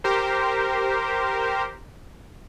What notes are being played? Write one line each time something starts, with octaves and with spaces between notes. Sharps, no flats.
G4 A#4 C5